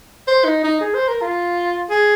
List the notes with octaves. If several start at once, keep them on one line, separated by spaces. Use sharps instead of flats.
C5
D#4
D#4
G#4
C5
A#4
F4
G#4